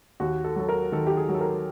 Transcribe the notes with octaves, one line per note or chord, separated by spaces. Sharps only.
D#2 F#4
A4
F#3 A4
A#4
D#3 A4
G4
G#4
F#3
A4
A#4